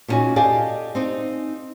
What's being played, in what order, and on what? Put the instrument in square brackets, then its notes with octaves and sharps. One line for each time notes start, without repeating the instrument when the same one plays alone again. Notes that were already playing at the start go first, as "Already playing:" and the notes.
[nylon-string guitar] A#2 G3 C#4 D#4 F#4 G#5
G4 A4 D5 D#5 F5 G#5
C4 D#4